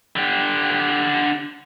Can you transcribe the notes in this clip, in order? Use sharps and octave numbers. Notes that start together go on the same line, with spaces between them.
D3 G4